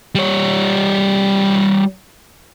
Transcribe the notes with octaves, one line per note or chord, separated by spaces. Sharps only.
G3 C#5